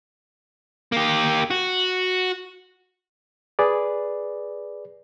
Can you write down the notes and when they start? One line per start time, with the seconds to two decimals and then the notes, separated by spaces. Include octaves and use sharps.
0.92 A#3 G4
1.51 F#4
3.59 G#4 B4 D5